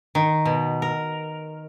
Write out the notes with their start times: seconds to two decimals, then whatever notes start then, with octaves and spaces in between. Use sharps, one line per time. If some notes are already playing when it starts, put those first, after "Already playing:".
0.15 D#3
0.45 B2
0.82 A#4